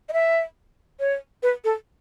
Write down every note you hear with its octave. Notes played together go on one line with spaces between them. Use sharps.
D#5
E5
C#5
B4
A4